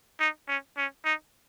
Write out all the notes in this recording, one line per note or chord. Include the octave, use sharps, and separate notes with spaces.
D#4
C#4
C#4
D#4